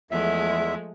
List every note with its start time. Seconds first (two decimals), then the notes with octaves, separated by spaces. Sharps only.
0.11 E2 F3 G#3 A3 E5